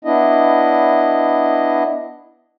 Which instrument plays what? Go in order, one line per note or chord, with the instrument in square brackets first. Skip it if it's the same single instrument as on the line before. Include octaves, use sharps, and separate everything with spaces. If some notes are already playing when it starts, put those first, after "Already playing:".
[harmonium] B3 D4 E4 D#5